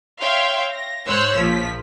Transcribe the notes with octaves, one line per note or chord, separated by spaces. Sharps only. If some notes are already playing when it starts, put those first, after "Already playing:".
C#5 E5 F5 G5 C6
A#6
G#2 C5 C#5 E6 F#6
A#1 F3 B6